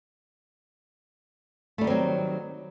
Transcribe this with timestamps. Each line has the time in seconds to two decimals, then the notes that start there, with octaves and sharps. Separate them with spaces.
1.78 A3
1.81 G3
1.84 D#3
1.87 C4
1.90 F#3